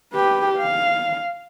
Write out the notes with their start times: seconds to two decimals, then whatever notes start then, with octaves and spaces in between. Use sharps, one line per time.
0.13 G4 B4
0.57 F5